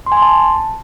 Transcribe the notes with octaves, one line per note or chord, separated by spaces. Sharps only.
C6
G#5
C6
A5